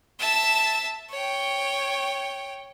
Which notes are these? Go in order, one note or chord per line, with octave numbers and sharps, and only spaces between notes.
E5 A5
C#5 G5